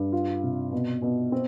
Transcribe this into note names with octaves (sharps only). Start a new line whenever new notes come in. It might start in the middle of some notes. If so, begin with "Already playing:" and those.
Already playing: G2
F4
C3
B2
B2
C4